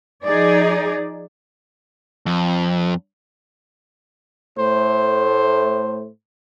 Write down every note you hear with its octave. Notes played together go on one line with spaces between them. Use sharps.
F3 D#4 G#4 D5
F2
A2 A3 C5